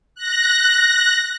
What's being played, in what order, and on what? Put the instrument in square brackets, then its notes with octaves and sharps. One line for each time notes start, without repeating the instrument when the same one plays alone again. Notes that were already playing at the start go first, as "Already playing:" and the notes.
[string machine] F#6 A#6